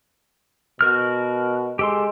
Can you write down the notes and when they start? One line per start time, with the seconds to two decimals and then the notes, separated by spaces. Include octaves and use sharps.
0.81 B2 F#4 A#4 F6
1.79 G#3 G4 A4 C6